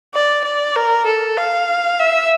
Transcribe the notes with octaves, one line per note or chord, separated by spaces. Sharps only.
D5
D5
A#4
A4
F5
E5